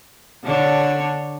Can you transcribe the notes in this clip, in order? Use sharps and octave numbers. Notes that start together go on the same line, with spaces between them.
D3 D4 C#5